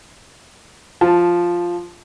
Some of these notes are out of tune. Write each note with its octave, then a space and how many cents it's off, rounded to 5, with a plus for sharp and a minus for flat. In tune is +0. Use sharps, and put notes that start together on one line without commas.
F3 +0 A5 +0